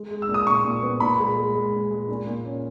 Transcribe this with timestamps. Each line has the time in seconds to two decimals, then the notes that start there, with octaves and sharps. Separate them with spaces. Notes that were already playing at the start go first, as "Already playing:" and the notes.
Already playing: G#3
0.11 G#3
0.22 E6
0.29 A#2
0.34 D#6
0.46 A#2 C#6
0.64 A#2
0.83 B3
1.00 A#2 B5
1.19 G#3
1.36 G#3
1.55 G#3
1.72 A#2
1.91 G#3
2.09 A#2
2.27 A#2
2.45 C#4